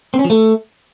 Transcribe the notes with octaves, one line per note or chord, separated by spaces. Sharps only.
C4
C#4
F3
A3